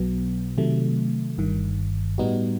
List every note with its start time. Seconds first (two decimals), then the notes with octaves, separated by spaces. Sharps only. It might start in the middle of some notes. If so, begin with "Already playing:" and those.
Already playing: B1 B2 F#3 B3
0.58 C3 D#3 F#3 A3
1.38 G1 G2 D#3
2.18 A2 G3 B3 D#4 F#4